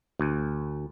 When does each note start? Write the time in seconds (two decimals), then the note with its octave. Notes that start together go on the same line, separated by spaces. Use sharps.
0.20 D2